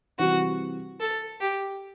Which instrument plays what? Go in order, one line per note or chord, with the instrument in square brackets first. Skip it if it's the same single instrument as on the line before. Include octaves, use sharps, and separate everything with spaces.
[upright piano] C3 E3 G3 [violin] F#4
[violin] A4
G4